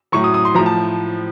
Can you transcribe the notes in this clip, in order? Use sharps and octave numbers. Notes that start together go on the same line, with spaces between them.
A2 F#3 C#6
D#6
D#6
C6
A2 F3 A#5
A5